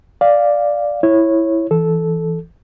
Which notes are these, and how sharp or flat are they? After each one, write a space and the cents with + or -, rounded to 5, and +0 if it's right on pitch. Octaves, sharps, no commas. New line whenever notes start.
D5 +0 F5 +0
E4 +0 C#5 -15
E3 +0 A4 -10